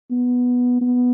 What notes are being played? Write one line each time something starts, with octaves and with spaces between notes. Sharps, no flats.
B3
B3